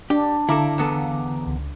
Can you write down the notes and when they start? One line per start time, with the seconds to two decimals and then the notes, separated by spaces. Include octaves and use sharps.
0.10 D4 G4
0.49 D3 E4 A4 F5 A#5 D6
0.78 E2 B3 A4
1.47 C#2